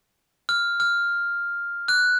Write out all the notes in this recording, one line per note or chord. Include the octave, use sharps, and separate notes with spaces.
F6
F6
F#6